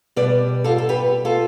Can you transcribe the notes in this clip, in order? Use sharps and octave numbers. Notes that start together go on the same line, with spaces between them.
B2 G3 B4 D5
F4 A4
A4
G4 B4
F4 A4